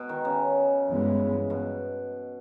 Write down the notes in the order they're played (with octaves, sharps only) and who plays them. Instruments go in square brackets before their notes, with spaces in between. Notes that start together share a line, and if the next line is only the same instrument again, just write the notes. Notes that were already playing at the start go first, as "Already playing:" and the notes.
Already playing: [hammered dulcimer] B2
D#3
C#3
[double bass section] G2 E3 G#3 B3
[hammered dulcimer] B2